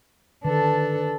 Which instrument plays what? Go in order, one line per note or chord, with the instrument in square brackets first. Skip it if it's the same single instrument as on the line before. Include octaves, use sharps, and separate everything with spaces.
[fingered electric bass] D3 D#3 [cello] D4 A4 [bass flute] B4